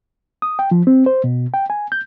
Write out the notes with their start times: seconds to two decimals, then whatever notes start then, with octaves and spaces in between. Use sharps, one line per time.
0.42 D#6
0.59 G5
0.71 F3
0.87 C4
1.06 C5
1.24 B2
1.54 G5
1.70 G#5
1.92 G6